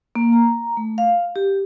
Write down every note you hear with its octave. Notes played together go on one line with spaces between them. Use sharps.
A#3
A#5
A3
F5
G4